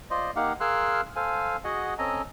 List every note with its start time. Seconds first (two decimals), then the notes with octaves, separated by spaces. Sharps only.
0.10 F4 C5 D5 D#5
0.36 A#3 D#4 G4 F5 F#5
0.60 G#4 A#4 F5 C6 E6 F#6
1.16 A4 C5 F5 G#5
1.64 F#4 G#4 D#5 F#5
1.98 C4 C#4 A4 D#5 G#5 A#5